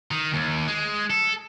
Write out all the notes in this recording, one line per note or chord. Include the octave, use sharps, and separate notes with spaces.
D#3
D#2
G#3
A4